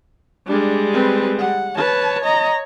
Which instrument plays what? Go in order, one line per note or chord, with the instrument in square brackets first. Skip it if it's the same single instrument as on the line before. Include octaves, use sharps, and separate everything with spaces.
[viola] G3 G#3 [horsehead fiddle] D4
[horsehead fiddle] C4 B4
F#5
[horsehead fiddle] B4 A5 [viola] C#5
[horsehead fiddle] D#5 A#5